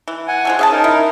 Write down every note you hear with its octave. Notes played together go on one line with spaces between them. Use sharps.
E3
F#5 G#5
F3 G#3 A3
C#4 G#4 F5 A5
D#4 A#4
E4